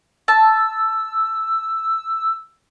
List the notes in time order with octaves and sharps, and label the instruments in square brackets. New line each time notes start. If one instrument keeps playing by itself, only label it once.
[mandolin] A5 [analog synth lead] E6